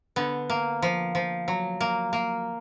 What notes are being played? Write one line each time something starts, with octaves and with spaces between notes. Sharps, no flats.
D3 B3
A#3
F3
F3
F#3
A#3
A#3